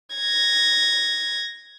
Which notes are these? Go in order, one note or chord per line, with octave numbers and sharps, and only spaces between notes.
G#6 A#6